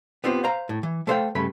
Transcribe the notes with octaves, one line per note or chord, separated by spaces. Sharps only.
B3 C4 F4 G4 C5
C5 F5 A#5
A2
E3
A3 A4 C5 D5 F5 G5
G2 C#3 A3 B5